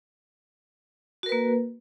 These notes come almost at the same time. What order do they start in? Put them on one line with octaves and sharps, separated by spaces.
F#4 A#4 B4 A#3